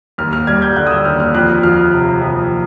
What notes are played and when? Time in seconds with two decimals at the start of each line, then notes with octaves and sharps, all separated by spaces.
0.18 D#2 F6
0.33 F6
0.47 G3 G#6
0.62 G6
0.76 D3 F#6
0.87 D#6
0.91 E6
1.05 D#2 F6
1.20 F6
1.34 F2 F#6
1.63 F3 F6
1.93 C3
2.21 F2